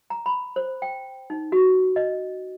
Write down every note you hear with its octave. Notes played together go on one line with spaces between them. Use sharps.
A#5
B5
C5
G5
D#4
F#4
D#5